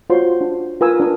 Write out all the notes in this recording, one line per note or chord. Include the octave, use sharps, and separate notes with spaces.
F4 F#4 C5 C#5 C6
D4
F4 A#4 B4 G#5 D#6 E6
D4 A#4 D#6